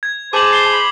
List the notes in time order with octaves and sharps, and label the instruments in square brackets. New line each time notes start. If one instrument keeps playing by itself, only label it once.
[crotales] G#6
[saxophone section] G#4 C5 [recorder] A5 [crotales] D6 F#7
[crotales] C7 G7
[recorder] B5